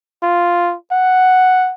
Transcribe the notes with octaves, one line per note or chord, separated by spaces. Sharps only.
F4
F#5